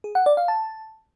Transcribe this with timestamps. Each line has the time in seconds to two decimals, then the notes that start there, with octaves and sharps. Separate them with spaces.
0.04 G#4
0.15 F#5
0.26 D5
0.37 F5
0.48 A5